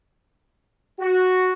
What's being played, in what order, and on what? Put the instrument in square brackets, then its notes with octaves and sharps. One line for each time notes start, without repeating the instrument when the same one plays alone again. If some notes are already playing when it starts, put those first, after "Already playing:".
[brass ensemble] F#4